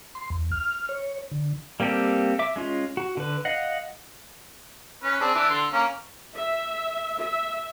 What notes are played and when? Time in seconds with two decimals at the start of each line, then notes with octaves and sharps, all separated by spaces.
0.15 C6
0.30 E2
0.51 F6
0.89 C#5
1.31 D3
1.80 G3 A#3 C4 G4 A4
2.39 E5 D6
2.56 G#3 C#4 F4
2.97 F#4
3.17 D3 B4
3.45 D#5 F5 F#5
5.04 C#4 B4
5.21 C4 D4 G#4
5.35 E3 D4
5.50 D3 C6
5.73 A#3 C#4
6.36 E5
7.20 E5